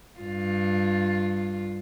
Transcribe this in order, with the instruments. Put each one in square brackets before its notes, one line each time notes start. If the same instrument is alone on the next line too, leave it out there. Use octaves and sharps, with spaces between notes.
[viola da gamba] G2 F4